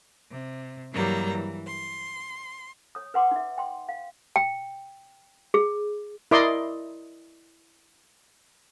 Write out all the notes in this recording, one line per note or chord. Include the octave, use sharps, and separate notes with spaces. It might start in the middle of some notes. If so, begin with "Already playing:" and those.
C3
G2 E3 F#3 G3 A#3 A#5
E3
C6
C#5 D#6
B4 F#5 C6 D6
D#4 E5
G5 C6
F5
G5
G#4
E4 A#4 D5 D#5 C6 D6